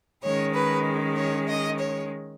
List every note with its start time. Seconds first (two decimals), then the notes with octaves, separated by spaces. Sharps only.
0.22 D#3 G#3 C#4 C#5
0.54 B4
1.16 C#5
1.47 D#5
1.78 C#5